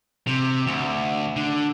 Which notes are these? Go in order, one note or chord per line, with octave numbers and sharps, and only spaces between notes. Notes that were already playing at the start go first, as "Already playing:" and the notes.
C3
D2
D3